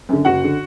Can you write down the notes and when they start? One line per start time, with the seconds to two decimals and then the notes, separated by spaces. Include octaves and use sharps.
0.09 F#2 D3
0.25 F#1 F#4 F#5
0.44 D3